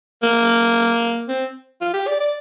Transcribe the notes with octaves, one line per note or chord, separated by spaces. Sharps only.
A#3
C4
F4
G4
D5
D5